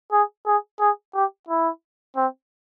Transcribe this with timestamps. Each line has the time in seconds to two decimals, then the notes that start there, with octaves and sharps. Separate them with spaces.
0.12 G#4
0.46 G#4
0.80 G#4
1.15 G4
1.49 E4
2.17 C4